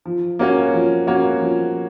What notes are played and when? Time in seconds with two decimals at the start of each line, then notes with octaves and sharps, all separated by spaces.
0.05 F3
0.39 A#3 C#4 F#4 C#5
0.74 F3
1.07 A#3 C#4 F#4 C#5
1.41 F3